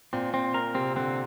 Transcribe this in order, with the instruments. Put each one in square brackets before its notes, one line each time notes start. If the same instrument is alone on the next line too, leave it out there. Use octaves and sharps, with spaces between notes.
[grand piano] A#2 [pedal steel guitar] C4
[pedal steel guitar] C4
A#4
[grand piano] C3 [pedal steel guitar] C4
[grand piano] D3 [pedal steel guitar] C4